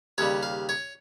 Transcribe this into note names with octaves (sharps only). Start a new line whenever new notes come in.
D#2 C#3 G3 C#5
F5
C#5